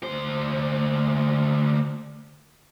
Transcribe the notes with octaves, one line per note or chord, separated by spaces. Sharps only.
D2 C5